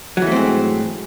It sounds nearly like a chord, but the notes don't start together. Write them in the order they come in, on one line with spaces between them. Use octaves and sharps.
F#3 E3 A3 C4 G#2